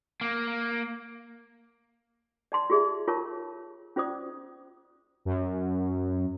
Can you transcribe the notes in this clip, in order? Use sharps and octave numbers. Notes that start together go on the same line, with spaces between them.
A#3
D5 A5 C6
F4 G4 G#4 D5 E5
F4 A#4 C#5 A5 C#6
C#4 F4 C5 D5 D#6
F#2